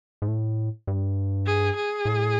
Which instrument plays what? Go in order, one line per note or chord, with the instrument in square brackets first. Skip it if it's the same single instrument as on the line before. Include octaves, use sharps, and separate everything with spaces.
[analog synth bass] G#2
A2
G2
[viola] G#4
G#4
[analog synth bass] A2